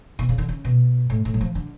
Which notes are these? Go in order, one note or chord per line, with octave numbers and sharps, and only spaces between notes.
B2
C#3
D3
C#3
B2
A2
A2
F#3
F3
D3